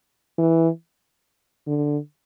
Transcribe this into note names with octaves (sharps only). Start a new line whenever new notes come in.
E3
D3